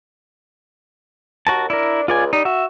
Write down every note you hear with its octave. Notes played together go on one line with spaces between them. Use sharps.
D#2 F#4 A#4 A5
D4 E4 A#4
C#2 F4 D5 G#5
G3 D#4
F#4 E5